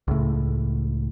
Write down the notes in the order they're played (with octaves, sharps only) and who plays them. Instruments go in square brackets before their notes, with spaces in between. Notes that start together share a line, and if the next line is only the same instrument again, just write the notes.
[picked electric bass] C#2 A2